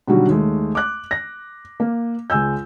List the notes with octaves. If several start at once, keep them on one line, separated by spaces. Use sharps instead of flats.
B2 D3 D#3 F#3 G3 F#4
D#2 G#3 A3
D6 F#6
A#6
A#3
C#2 G#3 G#5 E6 G6